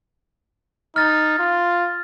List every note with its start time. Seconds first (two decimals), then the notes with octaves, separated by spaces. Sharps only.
0.96 D#4 F6 A6
1.39 F4